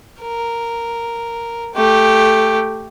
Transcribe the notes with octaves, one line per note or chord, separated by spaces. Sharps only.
A#4
A3 G4